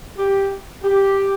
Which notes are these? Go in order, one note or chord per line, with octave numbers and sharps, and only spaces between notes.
G4
G4